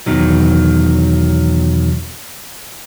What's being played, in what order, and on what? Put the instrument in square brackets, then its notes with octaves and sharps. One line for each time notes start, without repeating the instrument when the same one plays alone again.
[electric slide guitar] E2 B2 D#3 F#3